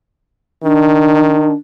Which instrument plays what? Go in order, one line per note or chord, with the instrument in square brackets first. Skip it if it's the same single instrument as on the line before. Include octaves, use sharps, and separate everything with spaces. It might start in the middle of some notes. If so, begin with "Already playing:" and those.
[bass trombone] D#3 [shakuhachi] D4